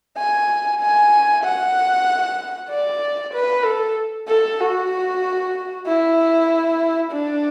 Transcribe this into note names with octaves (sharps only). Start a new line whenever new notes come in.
G#5
G#5
F#5
D5
B4
A4
A4
F#4
E4
D4